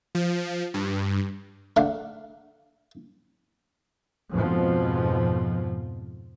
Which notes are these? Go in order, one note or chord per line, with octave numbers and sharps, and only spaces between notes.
F3
G2
A3 D4 F5 F#5
F2 G#2 B2 F3